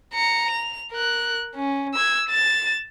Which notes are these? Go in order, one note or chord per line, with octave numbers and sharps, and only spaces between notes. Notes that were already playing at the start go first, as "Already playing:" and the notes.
A#5 C#7
F7
A#4 F#6
C#4
E6 G#6
A6 E7